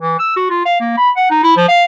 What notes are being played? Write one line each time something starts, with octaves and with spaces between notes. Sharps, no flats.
E3
E6
F#4
F4
F5
A#3
B5
F#5
D#4
E4
F3
F5